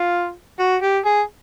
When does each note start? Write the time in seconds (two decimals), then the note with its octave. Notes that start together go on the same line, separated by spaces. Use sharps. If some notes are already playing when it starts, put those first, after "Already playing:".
Already playing: F4
0.59 F#4
0.82 G4
1.05 G#4